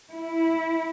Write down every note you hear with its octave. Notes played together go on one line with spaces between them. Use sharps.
E4